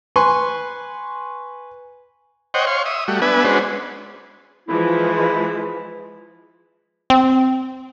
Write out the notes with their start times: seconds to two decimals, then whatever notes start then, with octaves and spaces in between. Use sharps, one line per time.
0.16 B4 G#5 C6 C#6
2.54 C5 C#5 D#5 F#5 G5
2.67 C#5 F5 C6
2.86 E5 D#6
3.08 G3 A3 F#4
3.22 B3 D4 B4 E5 G#5
3.44 G#3 C#4 D4 F#4 B4 C5
4.68 E3 F3 G#3 E4
7.10 C4